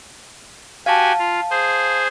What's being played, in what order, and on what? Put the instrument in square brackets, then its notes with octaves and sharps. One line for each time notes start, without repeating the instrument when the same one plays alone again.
[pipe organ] F#4 G4 G#5 [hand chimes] F5 A5
[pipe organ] F4
G#4 C5